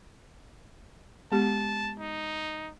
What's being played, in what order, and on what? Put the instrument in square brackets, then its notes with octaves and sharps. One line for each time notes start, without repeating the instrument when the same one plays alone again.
[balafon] G#3 B3 G4 [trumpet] A5
[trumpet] D#4